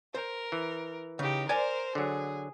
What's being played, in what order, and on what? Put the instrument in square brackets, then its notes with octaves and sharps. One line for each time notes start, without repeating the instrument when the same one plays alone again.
[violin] A#4 [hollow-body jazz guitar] C5
[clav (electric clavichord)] E3
[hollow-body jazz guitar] C#3 [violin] D#4 G4
[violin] A#4 C5 [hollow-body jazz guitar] D5 G#5
[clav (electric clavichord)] D3 F#3 [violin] G#4